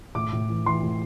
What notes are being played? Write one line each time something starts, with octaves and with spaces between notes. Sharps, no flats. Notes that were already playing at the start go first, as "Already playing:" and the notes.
A2 D6
A2
E3
E3 C6
A2